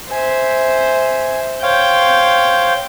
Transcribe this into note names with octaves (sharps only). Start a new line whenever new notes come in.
C5 E5 G#5
C5 C#5 F5 G5